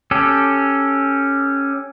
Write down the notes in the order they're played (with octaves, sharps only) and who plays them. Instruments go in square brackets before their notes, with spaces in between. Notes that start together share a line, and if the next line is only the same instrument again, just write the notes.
[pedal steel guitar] C#4 G4 A4